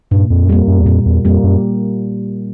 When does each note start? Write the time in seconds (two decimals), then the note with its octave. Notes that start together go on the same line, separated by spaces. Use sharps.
0.11 G2 A#2
0.30 F2
0.44 F#2
0.49 F2 G3 A#3
0.67 F#2
0.79 E2
0.86 F2 A#2
1.06 E2
1.25 F2 G3 A#3
1.43 F#2